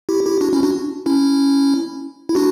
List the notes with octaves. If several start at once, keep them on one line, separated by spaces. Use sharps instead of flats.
E4 G4
E4 G4
D4 F#4
C#4 E4
D4 F#4
C#4 E4
E4
D4 F#4